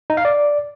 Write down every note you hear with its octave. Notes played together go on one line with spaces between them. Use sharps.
D#4
F5
D5